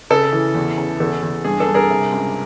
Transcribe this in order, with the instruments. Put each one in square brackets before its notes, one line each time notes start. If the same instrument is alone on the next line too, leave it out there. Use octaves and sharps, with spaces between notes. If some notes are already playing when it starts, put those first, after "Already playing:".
[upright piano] C#3 A4
E3
E2
C#3
E2 A4
E2
G2 G#4
A4
G2
G#4 A#4
C3
C#2